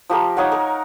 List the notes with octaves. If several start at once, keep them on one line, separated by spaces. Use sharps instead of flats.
F3 G4 A#4
D#4 C#5 F5 F#5
A#4